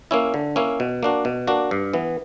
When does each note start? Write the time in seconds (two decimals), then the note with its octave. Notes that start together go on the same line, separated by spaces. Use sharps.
0.11 A#3 C#4 E4
0.34 D3
0.56 A#3 C#4 E4
0.80 B2
1.03 A#3 D4 F#4
1.25 B2
1.47 A#3 D4 F#4
1.71 G2
1.93 E3 B3